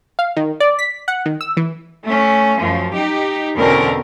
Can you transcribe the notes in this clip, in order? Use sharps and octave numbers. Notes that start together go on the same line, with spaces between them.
F5
D#3
D5
B6
F#5
D#3
E6
E3
A3 C#4
F#2 F3
D#4 G4
E2 B2 D3 C4 C#4 A#4